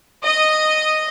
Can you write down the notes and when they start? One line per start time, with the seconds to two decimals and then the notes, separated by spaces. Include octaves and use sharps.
0.22 D#5